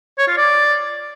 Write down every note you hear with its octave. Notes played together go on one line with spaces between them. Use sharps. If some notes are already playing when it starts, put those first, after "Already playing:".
C#5
F4
D5